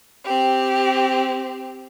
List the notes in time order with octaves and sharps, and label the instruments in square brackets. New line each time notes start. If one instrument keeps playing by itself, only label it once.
[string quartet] C4 G4